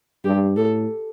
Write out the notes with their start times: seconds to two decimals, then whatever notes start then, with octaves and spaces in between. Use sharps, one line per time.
0.24 G2 G4
0.57 A2 A4